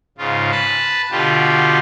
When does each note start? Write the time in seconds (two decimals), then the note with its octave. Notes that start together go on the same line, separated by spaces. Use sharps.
0.18 G#2 C#3 F4
0.51 B4 A5
1.11 B2 D3 F4 G4